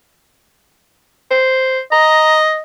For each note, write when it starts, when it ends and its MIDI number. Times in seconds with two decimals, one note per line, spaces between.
1.31 1.80 72
1.92 2.63 75
1.92 2.36 82